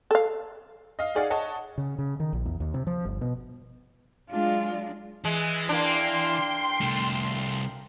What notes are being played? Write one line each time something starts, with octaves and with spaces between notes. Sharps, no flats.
A4 F5
D#5 F5
D#4 G#4 D5 F5 F#5
C#5 D#5 F#5 A5
C#3
C#3
D#3
A#1
E2
D#2
C3
F3
G1
B2
F#3 G#3 D4 F4
E3 G#3
A#3 D4 G5 C6
C2 A3